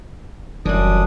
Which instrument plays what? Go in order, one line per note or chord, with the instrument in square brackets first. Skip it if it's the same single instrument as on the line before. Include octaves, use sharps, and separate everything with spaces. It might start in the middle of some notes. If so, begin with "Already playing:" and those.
[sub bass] F1 [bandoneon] F#2 D4 D#6 [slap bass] E3 G3